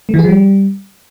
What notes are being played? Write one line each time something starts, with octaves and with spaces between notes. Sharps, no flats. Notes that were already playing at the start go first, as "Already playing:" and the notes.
A3
E3
G#4
F3
G3